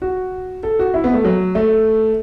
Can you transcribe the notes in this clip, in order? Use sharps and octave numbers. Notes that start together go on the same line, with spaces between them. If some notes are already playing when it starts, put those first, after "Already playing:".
F#4
A4
F#4
E4
B3
A3
F#3
A3